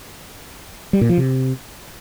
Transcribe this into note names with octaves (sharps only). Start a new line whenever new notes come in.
G3
A#2
F3
C3